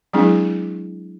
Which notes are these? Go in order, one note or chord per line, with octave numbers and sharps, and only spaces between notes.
F#3 G#3 C4 D4 E4 G#4